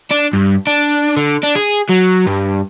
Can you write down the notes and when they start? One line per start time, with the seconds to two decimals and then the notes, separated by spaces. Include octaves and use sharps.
0.11 D4
0.33 G2
0.67 D4
1.17 D3
1.43 D4
1.55 G#4
1.90 F#3
2.27 G2